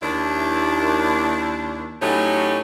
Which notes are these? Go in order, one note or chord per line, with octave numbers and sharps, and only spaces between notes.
D#2 D4 E4
A2 F#3 A3 C#4 D#4 G4